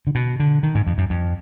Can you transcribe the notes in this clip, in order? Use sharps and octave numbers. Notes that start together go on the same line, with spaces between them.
D3
B2
D3
D#3
G#2
F2
F#2
F2